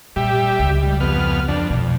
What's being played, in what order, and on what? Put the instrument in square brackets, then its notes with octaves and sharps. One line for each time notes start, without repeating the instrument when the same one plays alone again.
[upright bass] A#2 [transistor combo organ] G3 G4 E5
[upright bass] C#2
[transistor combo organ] G3
F2 B3 F6
F2 D4
[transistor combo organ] F2 [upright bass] B2